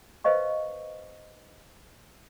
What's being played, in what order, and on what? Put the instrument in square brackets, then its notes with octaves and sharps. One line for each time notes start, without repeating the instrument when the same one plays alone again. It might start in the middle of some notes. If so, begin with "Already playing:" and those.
[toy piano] B4 C5 D#5 F5 C#6